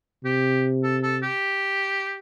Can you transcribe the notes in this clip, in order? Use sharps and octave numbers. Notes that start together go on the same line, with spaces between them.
C3 G4
A4
A4
G4